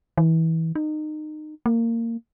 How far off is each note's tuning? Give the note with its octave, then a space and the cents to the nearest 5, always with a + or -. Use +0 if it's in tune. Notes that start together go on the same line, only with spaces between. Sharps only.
E3 -25
D#4 -25
A#3 -20